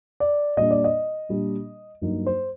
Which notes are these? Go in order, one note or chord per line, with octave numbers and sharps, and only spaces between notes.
D5
A#2 G3 D4 D#5
D5
D#5
A#2 G3 D4
G2 F#3 A#3 D#4
C5